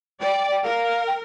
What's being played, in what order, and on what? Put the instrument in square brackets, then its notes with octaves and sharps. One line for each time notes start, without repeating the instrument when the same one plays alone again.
[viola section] D5 [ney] G5
[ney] G5
[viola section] A#4 [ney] F5
[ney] G5